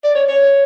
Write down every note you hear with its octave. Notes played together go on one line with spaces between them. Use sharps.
D5
C#5
C#5